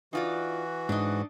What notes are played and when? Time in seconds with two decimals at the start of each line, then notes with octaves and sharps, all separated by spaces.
0.13 E3 D#4 F4 F#4 D5
0.89 G#2 D4 D#4